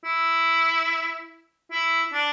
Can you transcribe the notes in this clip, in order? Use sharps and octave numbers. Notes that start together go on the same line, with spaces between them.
E4
E4
D4